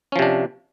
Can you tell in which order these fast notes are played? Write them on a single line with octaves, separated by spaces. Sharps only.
C#4 F3 C3 D4